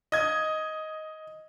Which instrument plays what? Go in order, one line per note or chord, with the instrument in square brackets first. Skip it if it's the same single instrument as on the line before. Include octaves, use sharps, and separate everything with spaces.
[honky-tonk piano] D#5 G#6